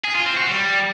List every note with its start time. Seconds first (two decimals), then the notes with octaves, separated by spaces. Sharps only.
0.04 G#4
0.15 F4
0.26 C4
0.37 F#4
0.48 G3